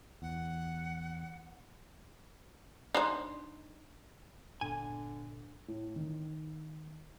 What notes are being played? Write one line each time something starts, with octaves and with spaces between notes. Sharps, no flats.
E2 F#5
D4 D#4 C5
G1 A#2 D3 B3 G#5
A2
D#3